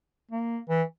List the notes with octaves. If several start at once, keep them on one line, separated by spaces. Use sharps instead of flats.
A#3
E3